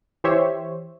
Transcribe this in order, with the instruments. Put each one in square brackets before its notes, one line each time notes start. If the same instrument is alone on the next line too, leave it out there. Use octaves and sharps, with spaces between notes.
[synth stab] E3 G4 C5 C#5 E5